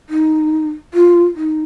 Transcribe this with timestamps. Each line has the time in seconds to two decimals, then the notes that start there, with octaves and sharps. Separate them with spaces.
0.09 D#4
0.94 F4
1.36 D#4